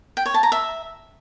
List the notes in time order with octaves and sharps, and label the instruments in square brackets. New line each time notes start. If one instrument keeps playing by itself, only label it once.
[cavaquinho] G5
C#5
A5
A#5
E5